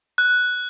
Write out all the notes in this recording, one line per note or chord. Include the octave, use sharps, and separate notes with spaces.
F#6